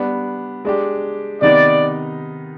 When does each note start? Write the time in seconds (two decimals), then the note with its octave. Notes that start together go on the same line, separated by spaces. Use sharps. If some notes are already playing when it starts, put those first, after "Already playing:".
Already playing: G3 B3 D4
0.65 G#3 D4 G4
1.42 C3 D#3 B3 D#4 D5